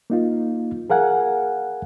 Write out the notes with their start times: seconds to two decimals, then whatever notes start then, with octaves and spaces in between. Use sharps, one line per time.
0.10 A#3 D#4 F4
0.90 G#4 A#4 F5 F#5 G#5